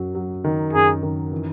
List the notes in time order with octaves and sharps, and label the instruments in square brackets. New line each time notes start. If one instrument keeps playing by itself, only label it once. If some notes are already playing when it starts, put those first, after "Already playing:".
Already playing: [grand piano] F#2 F#3
F#3
D#3
[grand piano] F#2 [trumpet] G#4
[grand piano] D#3
E3